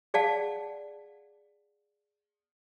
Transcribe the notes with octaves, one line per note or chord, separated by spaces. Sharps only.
G#4 D5 F5 F#5 A5